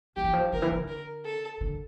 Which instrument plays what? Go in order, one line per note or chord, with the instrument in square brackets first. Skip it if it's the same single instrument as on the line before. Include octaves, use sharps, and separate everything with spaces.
[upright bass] F3 [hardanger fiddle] G4
[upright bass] E3
F3
[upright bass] D3 [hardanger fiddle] A#4
[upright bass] E3
D3
[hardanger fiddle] A#4
A4
[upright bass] D3